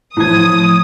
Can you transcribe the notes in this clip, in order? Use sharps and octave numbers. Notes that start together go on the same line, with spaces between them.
A2 E3 F3 D#6 G#6